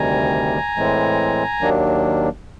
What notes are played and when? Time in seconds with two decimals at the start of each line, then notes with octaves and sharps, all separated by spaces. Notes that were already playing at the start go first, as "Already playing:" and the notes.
Already playing: D2 C3 D#3 G3 G#5 A#5
0.76 A2 E3 G#3 C4
1.60 D#2 D#3 F#3 A#3 D4